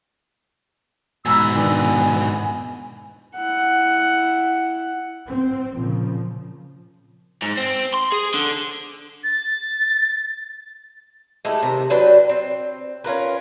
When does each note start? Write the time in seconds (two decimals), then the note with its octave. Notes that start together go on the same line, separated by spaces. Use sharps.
1.26 G#2 B2 G#5 A#5 B5 E6
1.55 D#3 B3 D4 G#5
3.36 E4 F#5
5.28 C4
5.77 A#2 C#3 F3
7.42 G#2
7.57 C4
7.94 C6
8.12 G#4
8.34 D3
9.24 A6
11.45 G#3 A3 E4 G4
11.63 C3 D#3 A#5
11.90 F#3 D4 B4 G5
12.29 C4
13.04 C#4 F4 A#4 B4